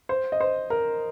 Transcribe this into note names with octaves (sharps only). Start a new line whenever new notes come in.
C5
D#5
C5
A#4